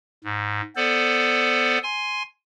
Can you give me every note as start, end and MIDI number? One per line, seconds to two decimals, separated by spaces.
0.24 0.61 44
0.76 1.78 59
0.76 1.78 69
0.76 1.78 72
0.76 1.78 74
1.83 2.23 80
1.83 2.23 84